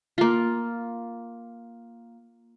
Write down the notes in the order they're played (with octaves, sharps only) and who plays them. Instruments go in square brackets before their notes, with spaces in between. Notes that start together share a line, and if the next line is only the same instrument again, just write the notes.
[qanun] A#3 F4